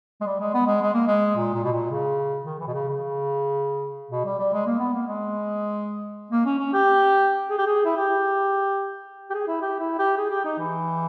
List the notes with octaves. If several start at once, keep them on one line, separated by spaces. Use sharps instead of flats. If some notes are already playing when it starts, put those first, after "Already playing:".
G#3
G3
G#3
B3
G#3
G#3
A#3
G#3
A#2
A#2
B2
A#2
C#3
D#3
E3
B2
C#3
C#3
B2
G3
G3
G#3
A#3
B3
A#3
G#3
A#3
C#4
C#4
G4
G#4
G4
G#4
E4
G4
G4
G#4
E4
G4
E4
G4
G#4
G4
D#4
E3